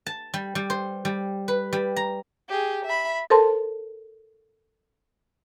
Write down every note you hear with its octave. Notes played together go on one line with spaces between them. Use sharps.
A5
G3
G3
C5
G3
B4
G3
A#5
G4 G#4
E5 B5
A4 A#4 C5 A5 C6